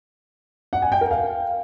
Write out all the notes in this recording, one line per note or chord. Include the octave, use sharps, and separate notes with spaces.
F#5
G#5
G5
A#4
F5